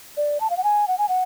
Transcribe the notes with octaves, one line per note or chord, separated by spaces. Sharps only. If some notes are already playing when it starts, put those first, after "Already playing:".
D5
A5
F5
F#5
G#5
F#5
G#5
F#5